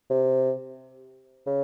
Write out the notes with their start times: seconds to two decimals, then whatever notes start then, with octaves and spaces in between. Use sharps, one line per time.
0.10 C3
1.47 C#3